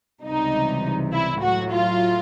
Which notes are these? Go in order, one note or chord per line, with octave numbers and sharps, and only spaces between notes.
C#2 C3 E3 G3 D#4
E4
A2 F#3 F#4
F4